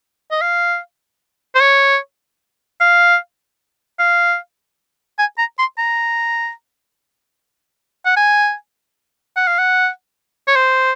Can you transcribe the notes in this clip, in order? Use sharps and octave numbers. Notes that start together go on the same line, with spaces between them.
D#5
F5
C5
C#5
F5
F5
G#5
A#5
C6
A#5
F#5
G#5
F#5
F5
F#5
C#5
C5